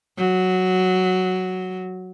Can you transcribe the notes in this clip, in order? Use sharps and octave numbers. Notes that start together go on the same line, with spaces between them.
F#3